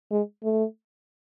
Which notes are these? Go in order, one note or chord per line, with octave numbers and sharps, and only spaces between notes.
G#3
A3